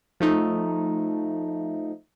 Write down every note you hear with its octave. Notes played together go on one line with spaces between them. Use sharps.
F3 A3 D#4